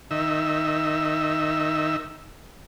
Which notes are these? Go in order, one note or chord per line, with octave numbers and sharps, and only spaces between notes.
D#3 E5